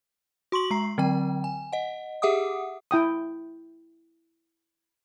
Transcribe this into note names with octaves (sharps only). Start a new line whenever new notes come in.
F#4 C6 C#6 F#7
G#3 A#5 C7
D3 F#3 C4 G5
G#5
D#5 F#5
G4 G#4 E5 F#5 D6 D#6
E4 G5 D#6